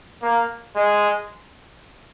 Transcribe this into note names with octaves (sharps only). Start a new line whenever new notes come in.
A#3
G#3